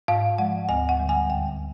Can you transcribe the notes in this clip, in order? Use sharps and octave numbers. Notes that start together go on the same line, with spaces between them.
G#2 F5
F3 G#3 F#5
D2 G#5
F#5
D3 G3
G#5
D#2 G5